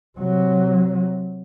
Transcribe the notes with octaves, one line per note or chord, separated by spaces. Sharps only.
C3 F#3